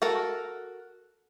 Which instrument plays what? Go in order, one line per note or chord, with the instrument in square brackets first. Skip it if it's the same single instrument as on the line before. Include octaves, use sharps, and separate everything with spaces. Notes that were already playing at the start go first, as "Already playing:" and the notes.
[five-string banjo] F#4 A4 A#4